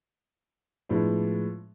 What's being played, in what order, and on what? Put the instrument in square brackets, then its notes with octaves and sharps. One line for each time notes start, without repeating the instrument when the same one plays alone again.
[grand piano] A2 F3 G#3 B3 D4